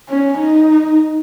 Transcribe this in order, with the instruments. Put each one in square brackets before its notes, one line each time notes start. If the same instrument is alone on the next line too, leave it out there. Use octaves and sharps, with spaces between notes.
[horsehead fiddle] C#4
D#4